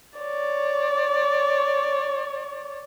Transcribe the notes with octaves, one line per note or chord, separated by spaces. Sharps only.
C#5 D5